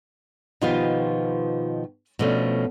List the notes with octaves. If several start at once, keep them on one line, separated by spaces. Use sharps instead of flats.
B2 D#3 F3 F4 G4 B4
B2 F3 A3 C#4 D4